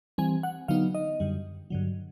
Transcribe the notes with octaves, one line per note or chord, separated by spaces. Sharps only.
E3 G3 C4 G#5
F#5
D3 F#3 B3 D#4 F5
D#5
F#2 D3 G3
G2 D3 F#3